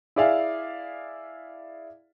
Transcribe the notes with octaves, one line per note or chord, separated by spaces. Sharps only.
E4 G#4 D5 E5 F5